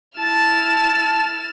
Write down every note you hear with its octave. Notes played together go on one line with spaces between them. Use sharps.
E4 A5 F6 A6 E7